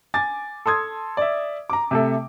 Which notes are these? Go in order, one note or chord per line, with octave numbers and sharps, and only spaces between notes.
G#5 D6 A6
A4 C6 D#6 G#6
D5 E5
A#5 D6
C3 A3 A4